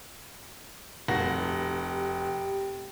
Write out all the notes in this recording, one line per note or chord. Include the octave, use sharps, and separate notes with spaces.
F1 F#4 G4 A#6